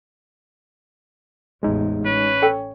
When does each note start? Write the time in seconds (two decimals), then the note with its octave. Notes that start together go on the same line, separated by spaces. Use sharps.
1.63 A1 E2 G#3 D#4
2.05 C#4 B4
2.42 A4 G5